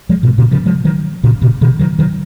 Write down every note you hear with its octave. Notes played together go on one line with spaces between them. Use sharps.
F3 G#3
G#2 B2
A#2 C#3
C#3 F3
F3 G#3
D#3 F#3
A#2 C#3
A#2 C#3
B2 D#3
D#3 F#3
D#3 F#3